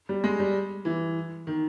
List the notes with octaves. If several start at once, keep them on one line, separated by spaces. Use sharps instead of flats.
G3
G#3
G3
E3
D#3